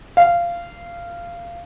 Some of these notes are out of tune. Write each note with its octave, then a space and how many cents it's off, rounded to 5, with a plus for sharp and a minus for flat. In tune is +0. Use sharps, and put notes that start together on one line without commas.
F5 -15